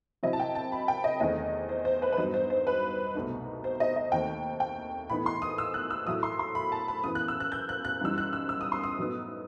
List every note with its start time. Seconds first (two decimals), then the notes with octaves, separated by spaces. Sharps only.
0.23 C3 F#3 C4 E4 D#5
0.33 A5
0.40 G5
0.55 A5
0.72 B5
0.88 G5
1.04 D#5
1.20 E2 D#3 A3 C4 D#5
1.69 C5
1.85 C5
2.02 B4
2.13 B4
2.17 G2 F#3 B3 D#4 C5
2.34 C5
2.50 C5
2.67 B4
3.15 C2 B2 A3 D#4
3.64 C5
3.80 D#5
3.96 D#5
4.12 D#2 D#3 A3 C4 G5
4.60 G5
5.10 A2 E3 B3 D#4 B5
5.26 C6
5.42 D#6
5.58 E6
5.74 F#6
5.91 E6
6.07 A2 F#3 A3 E4 D#6
6.23 C6
6.39 C6
6.55 B5
6.72 A5
6.88 B5
7.04 F#2 E3 B3 D#6
7.15 F#6
7.28 E6
7.40 F#6
7.52 G6
7.69 F#6
7.85 F#6
8.01 F#2 E3 G3 D#4 E6
8.18 F#6
8.33 E6
8.49 E6
8.61 D#6
8.72 C6
8.84 D#6
8.98 A2 F#3 B3 D#4